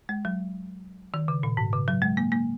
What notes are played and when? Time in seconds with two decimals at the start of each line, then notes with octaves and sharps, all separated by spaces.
0.09 G#3
0.25 F#3
1.14 D#3
1.28 C#3
1.43 A#2
1.57 G#2
1.73 C#3
1.88 F#3
2.02 G#3
2.17 A#3
2.32 A#3